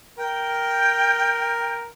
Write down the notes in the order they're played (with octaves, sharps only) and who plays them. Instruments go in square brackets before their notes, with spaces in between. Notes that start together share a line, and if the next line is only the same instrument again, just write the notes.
[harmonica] A#4 [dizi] G5